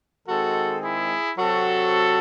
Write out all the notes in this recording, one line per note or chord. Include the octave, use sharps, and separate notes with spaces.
D#3 G#3 C4 F#4 A4
E4 G#4
C3 F#3 C4 F#4 A4